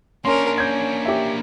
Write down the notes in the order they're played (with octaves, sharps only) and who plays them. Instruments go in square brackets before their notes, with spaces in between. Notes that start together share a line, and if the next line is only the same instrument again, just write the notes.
[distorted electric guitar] A#3 D4 [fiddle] C#4 A#4 [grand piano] C6
[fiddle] C#4 [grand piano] G6 G#6
[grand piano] G4 E5